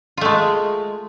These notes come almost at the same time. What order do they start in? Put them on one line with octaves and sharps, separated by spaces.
F4 A3 G#3